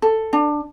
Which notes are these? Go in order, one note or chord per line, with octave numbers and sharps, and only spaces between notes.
A4
D4